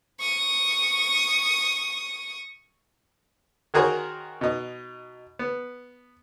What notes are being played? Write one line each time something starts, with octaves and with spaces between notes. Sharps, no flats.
C#6 D#6
D#3 F#4 G#4 A#4 C5 C#5
B2 D#4
B3